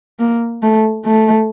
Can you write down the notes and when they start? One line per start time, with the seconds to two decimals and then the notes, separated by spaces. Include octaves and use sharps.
0.19 A#3
0.63 A3
1.06 A3